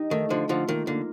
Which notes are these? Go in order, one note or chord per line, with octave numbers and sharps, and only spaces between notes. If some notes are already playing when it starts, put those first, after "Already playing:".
Already playing: D#4 G4
D#3 A3
D3 F3 F4
D3 F3 F4
D#3 A#3
D3 A#3